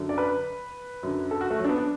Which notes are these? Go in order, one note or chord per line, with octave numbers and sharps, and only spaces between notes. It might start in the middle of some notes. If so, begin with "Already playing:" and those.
Already playing: F#2 D3
D5
B4
F#2 D3
A4
F#4
A3
F#3
D4
B3
D4